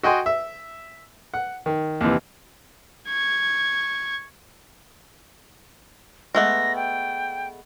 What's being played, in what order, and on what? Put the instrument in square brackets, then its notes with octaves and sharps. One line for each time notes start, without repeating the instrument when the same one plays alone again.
[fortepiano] F#4 D#5 G5 G#5 C6
E5
F#5
D#3
D#2 C3 E3
[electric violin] C#6 G#6
[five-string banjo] G#3 A3 B3 [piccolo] A#6
[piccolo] G5